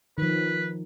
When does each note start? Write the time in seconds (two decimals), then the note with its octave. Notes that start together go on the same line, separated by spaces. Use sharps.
0.18 D#3 F3 B4